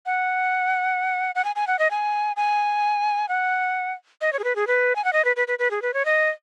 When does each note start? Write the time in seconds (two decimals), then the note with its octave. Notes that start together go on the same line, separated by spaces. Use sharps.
0.06 F#5
1.35 F#5
1.45 G#5
1.56 G#5
1.67 F#5
1.79 D#5
1.91 G#5
2.36 G#5
3.29 F#5
4.21 D#5
4.33 C#5
4.39 G#4
4.44 B4
4.56 G#4
4.67 B4
4.96 G#5
5.04 F#5
5.13 D#5
5.25 B4
5.36 B4
5.48 B4
5.59 B4
5.71 G#4
5.82 B4
5.94 C#5
6.05 D#5